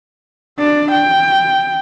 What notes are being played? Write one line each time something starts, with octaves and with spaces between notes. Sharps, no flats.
D4 D5
G5